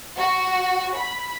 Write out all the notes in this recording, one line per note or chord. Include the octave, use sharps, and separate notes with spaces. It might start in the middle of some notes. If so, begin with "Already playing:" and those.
F#4
B5